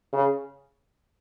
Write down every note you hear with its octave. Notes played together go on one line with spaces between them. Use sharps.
C#3